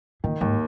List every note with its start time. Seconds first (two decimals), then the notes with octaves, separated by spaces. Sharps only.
0.24 A#2 D#3
0.41 D#2 G#2